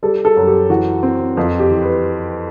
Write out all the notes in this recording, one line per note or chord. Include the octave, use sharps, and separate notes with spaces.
G3 A4
A4
F#2
G4
E3 F#4
C4
F2 F4
G4
E3
B4